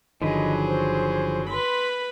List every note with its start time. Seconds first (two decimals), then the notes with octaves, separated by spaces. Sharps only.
0.22 G1 D3 D#3 F3 F#3 G#4 B4 D#5
0.67 C5
1.50 B4 B5 C6